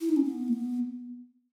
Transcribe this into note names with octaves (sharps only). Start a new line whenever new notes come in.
E4
D#4
C#4
B3
A#3
B3